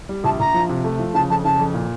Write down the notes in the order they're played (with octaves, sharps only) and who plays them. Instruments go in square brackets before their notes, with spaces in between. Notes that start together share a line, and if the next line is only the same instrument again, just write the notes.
[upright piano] G3
[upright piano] A#1 [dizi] A5
[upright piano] A#1 [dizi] A#5
[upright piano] F3
C3
A3
F3
[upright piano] C#3 [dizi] A5
[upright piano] F2 [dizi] A5
[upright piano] C#3 [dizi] A5
[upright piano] F2
A#2